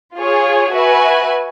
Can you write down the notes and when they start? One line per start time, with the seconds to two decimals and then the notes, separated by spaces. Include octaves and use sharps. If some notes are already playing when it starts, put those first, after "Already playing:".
0.15 F4 G#4 C#5
0.71 F#4 B4 E5 G#5